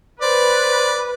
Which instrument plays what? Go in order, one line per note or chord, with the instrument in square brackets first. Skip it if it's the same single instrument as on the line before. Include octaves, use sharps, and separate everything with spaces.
[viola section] B4 [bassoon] C5 [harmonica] D5